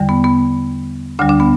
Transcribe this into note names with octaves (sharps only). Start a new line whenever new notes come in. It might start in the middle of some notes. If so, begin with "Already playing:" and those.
Already playing: E2 D3 G3
B3
B3
D2 D3 G3 D4
D4
B3